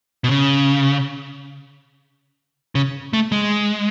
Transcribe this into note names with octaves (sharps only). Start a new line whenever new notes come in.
B2
C#3
C#3
A3
G#3